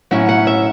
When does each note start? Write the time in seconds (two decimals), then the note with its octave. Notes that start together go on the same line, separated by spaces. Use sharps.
0.11 A2 F#3 C#4 E4 F#5
0.29 F#5
0.47 E5